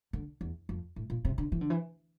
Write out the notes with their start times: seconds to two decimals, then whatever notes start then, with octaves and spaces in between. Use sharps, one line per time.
0.13 D3
0.41 E2
0.69 F2
0.96 A2
1.10 A#2
1.25 C3
1.38 D3
1.52 E3
1.61 D3
1.70 E3